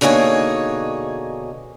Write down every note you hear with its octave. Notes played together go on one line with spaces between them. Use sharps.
B2 D3 A#3 D#4 G#4 C#5